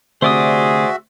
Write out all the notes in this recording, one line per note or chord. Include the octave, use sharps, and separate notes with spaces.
D2 C3 F#4 G#4 C5 D5 E5 D#6